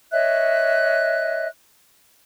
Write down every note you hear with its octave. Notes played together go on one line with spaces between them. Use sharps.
C#5 D#5 E5 F#6